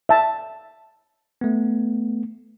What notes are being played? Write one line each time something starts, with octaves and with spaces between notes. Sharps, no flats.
E5 A5
A3 B3